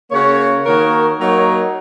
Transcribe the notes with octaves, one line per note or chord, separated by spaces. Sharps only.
C#3 A#3 F#4 C#5
D#3 A#3 F#4 A#4 C#5
F#3 A#3 D#4 A#4 C#5